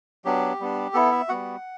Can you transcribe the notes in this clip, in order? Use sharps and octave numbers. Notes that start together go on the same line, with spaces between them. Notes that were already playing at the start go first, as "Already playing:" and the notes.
F#3 B3 D4 G4
G3 B3 D4
B3 E4 A4
E5
G3 B3 F#4 F#5